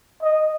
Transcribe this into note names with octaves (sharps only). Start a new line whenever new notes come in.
D#5